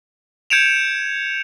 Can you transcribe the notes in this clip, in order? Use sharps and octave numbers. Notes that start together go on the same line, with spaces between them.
G6 G#6 C#7 D7 E7 F7